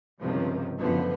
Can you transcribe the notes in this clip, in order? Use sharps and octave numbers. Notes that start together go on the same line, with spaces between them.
C#2 G2 C3 D#3 F3
F#1 F#2 A2 D3 F3 B3